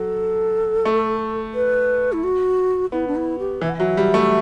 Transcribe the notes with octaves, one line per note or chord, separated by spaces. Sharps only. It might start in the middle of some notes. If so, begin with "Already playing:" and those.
Already playing: F#3 A4
A3
B4
E4
F#4
B3 E4
D4
E4
G4
E3 E5
F#5
F#3 E5
G3
A3